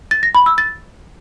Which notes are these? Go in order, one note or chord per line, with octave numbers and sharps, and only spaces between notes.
A6
A#6
B5
E6
A6